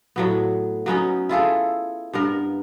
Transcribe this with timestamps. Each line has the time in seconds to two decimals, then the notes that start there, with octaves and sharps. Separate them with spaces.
0.16 A2 F#3 B3
0.86 F#3 B3 C#4 D#4
1.29 E4 F4 G#4 A4
2.13 G2 B3 A#4